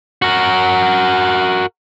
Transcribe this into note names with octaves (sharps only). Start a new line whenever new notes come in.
F#4 A#4